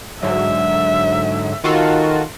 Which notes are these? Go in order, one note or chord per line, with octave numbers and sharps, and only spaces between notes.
G#2 D3 F#3 E5
D#3 F4 F#4 A4